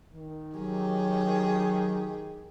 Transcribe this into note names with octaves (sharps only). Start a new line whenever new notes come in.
D#3
F#3 G4 G#4